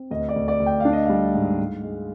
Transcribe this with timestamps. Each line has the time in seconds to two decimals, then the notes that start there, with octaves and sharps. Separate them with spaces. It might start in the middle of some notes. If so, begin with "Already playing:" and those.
Already playing: C4
0.11 D2 D#5
0.29 D5
0.36 D2
0.48 D5
0.60 D2
0.66 G5
0.80 D4 F5
0.93 D#5
1.06 G3 F5
1.35 G#2
1.59 G#2
1.83 G#3